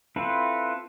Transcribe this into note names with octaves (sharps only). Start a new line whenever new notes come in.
C4 E4 F4 A4 B4